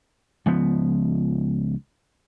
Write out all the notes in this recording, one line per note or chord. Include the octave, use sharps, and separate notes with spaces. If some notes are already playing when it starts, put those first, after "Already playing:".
C#2 F3 B3